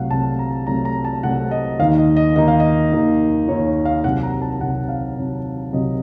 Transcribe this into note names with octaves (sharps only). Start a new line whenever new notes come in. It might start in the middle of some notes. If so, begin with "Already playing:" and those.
Already playing: C2 C3 F#3 A3 F5 F#5
C2 C3 F#3 A3 A5
A#5
C2 C3 F#3 A3 A#5
A#5
A5
C2 C3 F#3 A3 F#5
D#5
D#2 D#3 A#3 D#4 F5
D#5
D#5
D#2 D#3 A#3 D#4 D#5
F5
D#5
D#2 D#3 A#3 D#4
D#2 D#3 A#3 D#4 C#5
F5
C2 C3 F#3 F#5
A#5
A5
C2 C3 F#3 F#5
F5
C2 C3 F#3
C2 C3 F#3 D#5